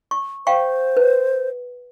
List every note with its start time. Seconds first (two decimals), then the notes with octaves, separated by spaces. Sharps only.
0.11 C#6
0.47 C5 F5 G5 C#6
0.97 B4